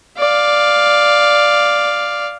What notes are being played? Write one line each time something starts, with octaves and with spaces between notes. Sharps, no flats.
D5 F5